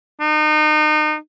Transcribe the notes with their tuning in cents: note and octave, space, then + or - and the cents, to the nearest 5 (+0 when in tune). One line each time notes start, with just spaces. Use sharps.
D#4 -30